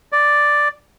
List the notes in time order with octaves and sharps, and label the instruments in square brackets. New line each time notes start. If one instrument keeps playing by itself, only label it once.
[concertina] D5